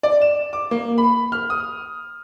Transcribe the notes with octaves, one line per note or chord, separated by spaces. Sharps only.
D5
E7
D6
A#3
B5
F6
D#6